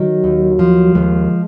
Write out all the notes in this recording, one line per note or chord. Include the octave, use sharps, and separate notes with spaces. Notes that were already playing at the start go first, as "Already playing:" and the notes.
Already playing: D#3 F#3
D#2
F3
D#2 G#3